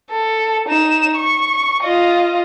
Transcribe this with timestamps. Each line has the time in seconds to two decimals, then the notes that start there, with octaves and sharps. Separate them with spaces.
0.10 A4
0.69 D#4 E7
1.17 C#6
1.83 F4 D#5